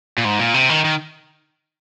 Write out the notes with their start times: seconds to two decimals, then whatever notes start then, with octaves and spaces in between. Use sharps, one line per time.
0.18 A#2
0.25 G#2
0.39 A#2
0.54 C3
0.69 D#3
0.85 D#3